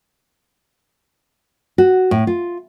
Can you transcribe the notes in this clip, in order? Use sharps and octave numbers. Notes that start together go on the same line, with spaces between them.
F#4
A2
F4